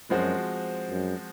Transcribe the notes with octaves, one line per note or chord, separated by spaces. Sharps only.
F#2 F3 G#3 C4 F#4 C5
F#2